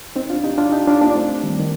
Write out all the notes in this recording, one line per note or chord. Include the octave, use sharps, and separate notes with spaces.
C4 D#4
D4 F4
D#4 G4
D4 F4
D#4 G4
D4 F4
A#3 D4
A3 C4
D#3 G3
D#3